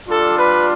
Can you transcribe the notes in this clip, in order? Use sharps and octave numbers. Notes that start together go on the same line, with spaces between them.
G3 D4 F4 A4
B4